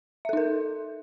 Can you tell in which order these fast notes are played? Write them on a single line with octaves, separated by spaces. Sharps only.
E5 A4 D#4 A#4